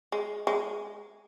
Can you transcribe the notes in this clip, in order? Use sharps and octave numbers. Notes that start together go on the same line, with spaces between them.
G#3
G#3